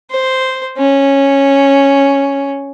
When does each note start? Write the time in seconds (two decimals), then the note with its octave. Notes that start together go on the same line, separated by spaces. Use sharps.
0.10 C5
0.78 C#4